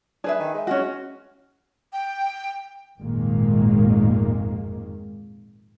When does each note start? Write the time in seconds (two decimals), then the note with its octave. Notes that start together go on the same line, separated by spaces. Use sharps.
0.24 D4 G#4 B4 E5
0.40 D#3
0.54 G#3
0.67 C#4 F4 F#4
1.93 G5
2.99 G#1 F2 A#2 D#3 G#3 A#3